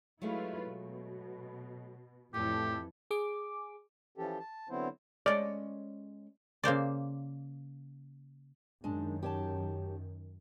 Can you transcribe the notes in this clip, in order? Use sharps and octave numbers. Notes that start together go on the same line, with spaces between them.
F#3 G#3 A3 E4 F4 B4
B2
F2 A2 E3 B3 G4 A4 D5
G#4 D6
E3 F3 C#4 G4 A4
A5
D3 F#3 B3 C4 E4 C5
G#3 C#4 D5
C#3 A#3 C5 D5
F#2 D#3 G#3 D4
G4 C#5 A5